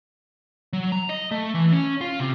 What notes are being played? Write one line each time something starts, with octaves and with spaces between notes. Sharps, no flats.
F#3
A#5
D#5
A3
E3
C#4
F4
C3